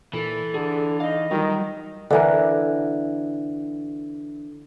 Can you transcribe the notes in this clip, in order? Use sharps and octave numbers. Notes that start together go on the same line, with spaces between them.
A#2 E3 A4
D3 G#4
D#4 D#5 F5
D#3 F#3 G3 F4
D3 E3 A#4